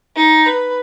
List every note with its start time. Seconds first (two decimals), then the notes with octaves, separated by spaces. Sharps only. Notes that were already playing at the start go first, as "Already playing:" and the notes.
0.16 D#4
0.46 B4